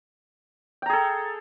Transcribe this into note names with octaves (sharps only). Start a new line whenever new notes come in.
G#4 A4 G5 A#5